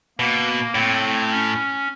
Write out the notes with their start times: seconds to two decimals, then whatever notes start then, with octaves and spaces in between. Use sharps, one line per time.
0.19 B2 A#3
0.75 A2 C4
1.30 C#4